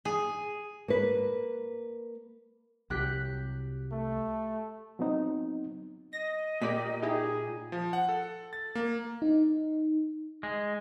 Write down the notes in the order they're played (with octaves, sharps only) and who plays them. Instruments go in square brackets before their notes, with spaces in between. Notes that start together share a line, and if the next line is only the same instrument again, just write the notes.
[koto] G#4
[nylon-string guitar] A#3 B4
[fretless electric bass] C2 F#3 [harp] G4 F#6 B6
[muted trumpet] A3
[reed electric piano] F#3 B3 C4 D#4
[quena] D#5 [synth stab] A#6
[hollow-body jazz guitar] A#2 [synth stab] G4 D5 B6
[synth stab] D#4 E4 G4 [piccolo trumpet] G#4
[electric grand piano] F3
F#5
A4
A6
A#3
[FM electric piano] D#4
[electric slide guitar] G#3